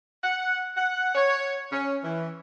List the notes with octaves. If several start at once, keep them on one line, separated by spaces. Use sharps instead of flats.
F#5
F#5
C#5
C#4
E3